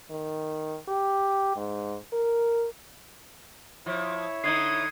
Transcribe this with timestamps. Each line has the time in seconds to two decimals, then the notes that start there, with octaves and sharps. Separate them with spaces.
0.10 D#3
0.88 G4
1.56 G#2
2.13 A#4
3.86 F3 E4 C#5
4.44 D3 D#4 D#6 G#6 C7